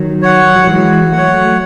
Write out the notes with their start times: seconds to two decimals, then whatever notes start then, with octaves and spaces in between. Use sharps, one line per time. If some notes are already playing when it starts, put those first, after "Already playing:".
Already playing: D#3 F#3
0.22 C#5 F#5
0.56 F#3
0.67 E3 G#3 F#4
1.12 F#3 A3 F#5
1.17 C#5